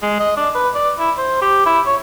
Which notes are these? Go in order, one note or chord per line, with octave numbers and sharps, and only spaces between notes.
G#3
D#5
D4
B4
D5
E4
C5
G4
E4
C#5